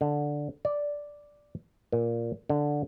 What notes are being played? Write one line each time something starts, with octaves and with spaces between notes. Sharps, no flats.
D3
D5
A#2
D3